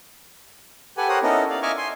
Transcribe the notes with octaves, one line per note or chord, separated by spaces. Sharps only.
G4 A4 B4 F#5 G#5
G4 A#4 C5 C#5 F#5 D#6
B3 C#4 D#4 E4 A4 A#4
D5 F5
D#5 E5 G#5 C#6 D6 F6
G#5 C6